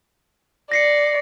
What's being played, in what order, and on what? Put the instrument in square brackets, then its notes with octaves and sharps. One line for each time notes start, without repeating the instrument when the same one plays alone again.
[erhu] D5 [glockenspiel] A#6 C7 C#7